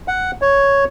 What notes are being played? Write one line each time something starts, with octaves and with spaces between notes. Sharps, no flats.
F#5
C#5